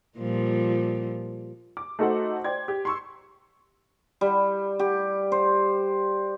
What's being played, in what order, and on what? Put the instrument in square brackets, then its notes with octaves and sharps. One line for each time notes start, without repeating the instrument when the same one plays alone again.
[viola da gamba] A#2 F3 G3
[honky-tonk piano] D6
A3 D#4 F#4 A4 C5 F#5
C5 D5 G5 G#6
G4
C6 C#6 E6
[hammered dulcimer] G3
G4
C5